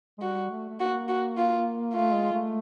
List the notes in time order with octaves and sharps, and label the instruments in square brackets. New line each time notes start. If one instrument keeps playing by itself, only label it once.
[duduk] G#3
[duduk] G3 [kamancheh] F#4
[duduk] A3
A3
[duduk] A#3 [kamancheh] F#4
[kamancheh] F#4
F4
[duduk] A3 [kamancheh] F4
[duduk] G#3
A3